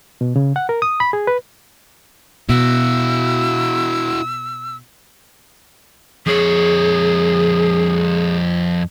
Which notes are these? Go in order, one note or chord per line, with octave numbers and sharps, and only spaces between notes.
B2
C#3
F#5
A#4
D#6
B5
G#4
B4
B2 E4 F#4 E6
F2 G#4 C#5